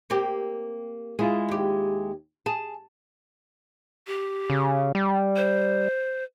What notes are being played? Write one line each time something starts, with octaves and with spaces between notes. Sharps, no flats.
A#3 C4 G4
G#3 E4 F4 G#4
D#2 G4
G#4 A5
G4
C#3
G3
C5